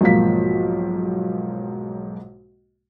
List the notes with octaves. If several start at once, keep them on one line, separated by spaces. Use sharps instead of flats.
B1 G#2 F3 A#3 F5 B6